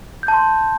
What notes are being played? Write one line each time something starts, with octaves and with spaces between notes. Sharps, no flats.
G6
A5
C6